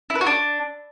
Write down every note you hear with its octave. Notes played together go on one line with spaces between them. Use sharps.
E4
B4
F#4
D4